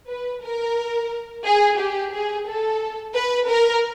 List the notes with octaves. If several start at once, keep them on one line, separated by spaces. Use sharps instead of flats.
B4
A#4
G#4
G4
G#4
A4
B4
A#4